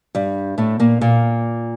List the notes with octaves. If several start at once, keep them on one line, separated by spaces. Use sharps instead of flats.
G2 G3
A2 A3
A#2 A#3
A#2 A#3